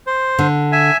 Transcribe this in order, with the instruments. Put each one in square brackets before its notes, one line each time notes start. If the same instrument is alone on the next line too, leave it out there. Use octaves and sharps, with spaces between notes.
[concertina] C5
[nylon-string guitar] D3
[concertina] E5 G#5